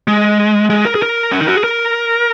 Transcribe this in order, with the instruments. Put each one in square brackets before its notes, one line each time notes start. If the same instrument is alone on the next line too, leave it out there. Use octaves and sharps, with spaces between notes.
[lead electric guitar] G#3
G#3
A#4
G#4
A#4
C#4
D#4
F#4
G#4
A#4